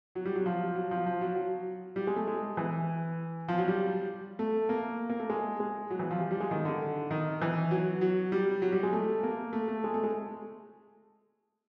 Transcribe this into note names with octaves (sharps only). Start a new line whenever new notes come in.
F#3
G3
F#3
F3
F#3
F3
F3
F#3
F#3
G3
G#3
A3
G#3
E3
F3
F#3
G3
A3
A#3
A#3
A3
G#3
G#3
F#3
E3
F3
G3
G3
G#3
D#3
D3
D#3
E3
F#3
F#3
G3
F#3
G3
G#3
A3
A#3
A3
A3
G#3
A3
G#3